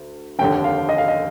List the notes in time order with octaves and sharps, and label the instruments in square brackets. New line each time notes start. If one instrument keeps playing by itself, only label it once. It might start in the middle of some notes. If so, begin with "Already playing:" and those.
Already playing: [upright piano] D2
F1 D#2 D3 G5
F5
D#5
F5
D#5